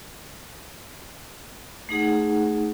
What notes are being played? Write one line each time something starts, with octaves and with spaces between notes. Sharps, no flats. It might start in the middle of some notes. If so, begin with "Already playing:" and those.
A3 D#4 G#4 F#5